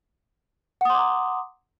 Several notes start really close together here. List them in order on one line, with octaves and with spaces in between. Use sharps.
F#5 D#6 C6 D6 A#5